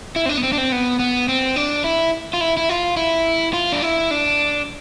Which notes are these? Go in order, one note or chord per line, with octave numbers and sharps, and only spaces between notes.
E4
C4
D4
B3
C4
D4
C4
B3
B3
C4
D4
E4
F4
E4
E4
F4
E4
F4
D4
E4
D4